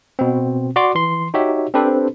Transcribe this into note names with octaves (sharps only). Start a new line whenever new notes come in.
B2 C4
F#4 D5 C6 D6
E3 C6
D#4 F#4 G4 C#5 E5
C4 D4 G4 A4 B4 C5